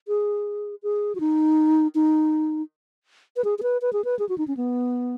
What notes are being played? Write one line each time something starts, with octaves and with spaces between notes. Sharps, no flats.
G#4
G#4
F#4
D#4
D#4
B4
G#4
G#4
B4
B4
G#4
B4
G#4
F#4
D#4
C#4
B3